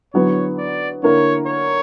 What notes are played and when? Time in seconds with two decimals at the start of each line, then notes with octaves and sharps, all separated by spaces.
0.14 D3 F#3 B3 E4 C#5
0.58 D5
1.03 D3 A#3 E4 A#4 C#5
1.47 C#5